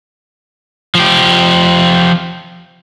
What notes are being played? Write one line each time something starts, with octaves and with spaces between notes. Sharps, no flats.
F3 G4